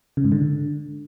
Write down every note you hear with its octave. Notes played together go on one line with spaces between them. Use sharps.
C#3
G#2
D3